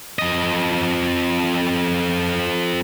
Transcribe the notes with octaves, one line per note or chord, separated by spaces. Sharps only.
F2 D#5